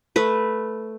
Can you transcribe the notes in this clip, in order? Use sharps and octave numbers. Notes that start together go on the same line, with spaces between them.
A3 B4